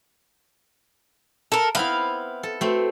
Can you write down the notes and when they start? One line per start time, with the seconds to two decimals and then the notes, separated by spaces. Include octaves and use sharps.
1.52 A4 A#4
1.75 B3 C4 E4 F5
2.43 A4
2.61 A3 C4 F#4 B4 C6